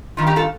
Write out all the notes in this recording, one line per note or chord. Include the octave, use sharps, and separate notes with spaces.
G2 D#3 F4
D#4 G4
F4 A4